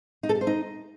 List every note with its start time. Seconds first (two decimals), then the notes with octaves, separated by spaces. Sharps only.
0.23 D#4
0.29 A4
0.35 G4
0.41 C5
0.47 D#4